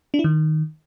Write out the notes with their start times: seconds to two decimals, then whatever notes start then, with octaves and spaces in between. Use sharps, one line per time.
0.14 D4
0.19 E4
0.24 D#3